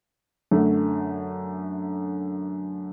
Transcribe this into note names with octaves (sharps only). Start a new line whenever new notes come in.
F#2 D3 A3